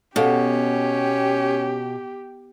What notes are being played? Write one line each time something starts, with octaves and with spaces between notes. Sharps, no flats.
B2 C#4 G4 A4 F5 F#5